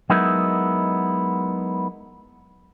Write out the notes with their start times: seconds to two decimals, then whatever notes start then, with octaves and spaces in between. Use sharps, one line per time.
0.10 F#3 G#3 B3 D#4 E4 A#4